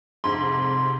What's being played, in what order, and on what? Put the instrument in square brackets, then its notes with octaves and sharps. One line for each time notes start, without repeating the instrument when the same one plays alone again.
[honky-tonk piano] F2 G#2 [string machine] C3 [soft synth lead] C6